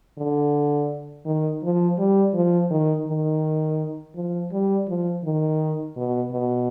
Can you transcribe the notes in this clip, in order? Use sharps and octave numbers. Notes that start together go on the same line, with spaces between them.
D3
D#3
F3
G3
F3
D#3
D#3
F3
G3
F3
D#3
B2
B2